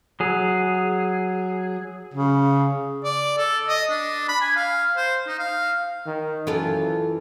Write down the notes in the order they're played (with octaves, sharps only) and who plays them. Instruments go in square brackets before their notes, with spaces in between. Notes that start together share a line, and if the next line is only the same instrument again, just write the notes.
[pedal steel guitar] F#3 G#4
[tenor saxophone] C#3
[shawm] D5
A4
D#5
D4
B5
G#5
F5
C5
D#4
F5
[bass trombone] D#3
[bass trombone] F#2 [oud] E3 F4 A4